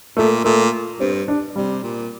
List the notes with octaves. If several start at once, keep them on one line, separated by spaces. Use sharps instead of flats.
A#2 A3
A#2 A3
G2 C4
D4
C3 G3
A#2